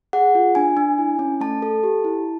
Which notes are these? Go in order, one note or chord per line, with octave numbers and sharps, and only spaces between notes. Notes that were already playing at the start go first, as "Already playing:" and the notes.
G#4 F#5
F4
D4 G#5
D4
E4
C#4
A3 A5
A4
G4
E4